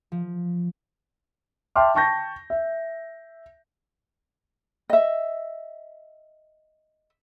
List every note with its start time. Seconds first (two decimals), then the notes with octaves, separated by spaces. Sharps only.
0.12 F3
1.76 E5 G5 A5 C6 D6 F6
1.95 G5 A5 C#6 G6 A#6
2.50 E5
4.90 D#5 E5